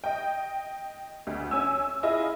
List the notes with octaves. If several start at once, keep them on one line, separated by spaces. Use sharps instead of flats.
D#5 G5
D2
C#4 G#5 E6
E4 F4 G#4 D#5